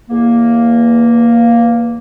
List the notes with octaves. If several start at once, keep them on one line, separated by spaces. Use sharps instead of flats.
E2 A#3